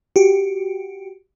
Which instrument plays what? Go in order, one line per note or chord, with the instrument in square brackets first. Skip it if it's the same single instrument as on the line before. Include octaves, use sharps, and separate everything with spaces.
[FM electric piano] F#4 G4